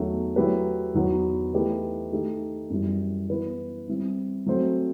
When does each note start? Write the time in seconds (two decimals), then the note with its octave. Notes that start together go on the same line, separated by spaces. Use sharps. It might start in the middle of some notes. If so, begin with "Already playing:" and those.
Already playing: E2 D#3 F#3 A3
0.36 F#3 A3 E4 G4 B4
0.94 E2 D#3 F#3 B3 F#4
1.53 E3 A3 D#4 G4 B4
2.12 D#3 A3 D#4 G4
2.70 F#2 E3 G3
3.29 E3 B3 E4 B4
3.88 G3 C4 E4
4.46 F#3 A3 C4 F#4 C5